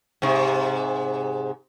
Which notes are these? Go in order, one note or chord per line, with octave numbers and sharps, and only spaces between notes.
G#2 C3